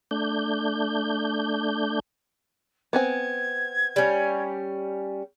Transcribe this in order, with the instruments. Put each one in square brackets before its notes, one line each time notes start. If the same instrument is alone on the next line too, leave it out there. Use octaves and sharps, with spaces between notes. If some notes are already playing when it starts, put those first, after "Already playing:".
[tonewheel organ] A3 D4 G6
[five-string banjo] B3 C4 G#5 [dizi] G#6
[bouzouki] G3 C#4